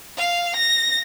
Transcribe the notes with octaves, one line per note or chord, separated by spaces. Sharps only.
F5
A#6